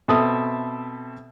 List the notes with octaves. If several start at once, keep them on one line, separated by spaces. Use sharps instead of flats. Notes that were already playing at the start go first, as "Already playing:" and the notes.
B2 C4 A4 E5 A5 D#6